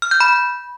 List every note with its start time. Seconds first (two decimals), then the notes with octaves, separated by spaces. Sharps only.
0.02 F6
0.11 G6
0.20 B5